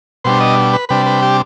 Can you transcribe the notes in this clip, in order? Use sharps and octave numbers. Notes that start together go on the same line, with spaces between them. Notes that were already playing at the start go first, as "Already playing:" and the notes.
B2 G3 D4 C5
D#5
B4
C3 G3 D4 B4
B4
G4